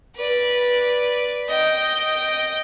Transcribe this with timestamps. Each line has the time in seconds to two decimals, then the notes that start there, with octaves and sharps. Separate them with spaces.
0.16 B4 D5
1.48 D#5 G5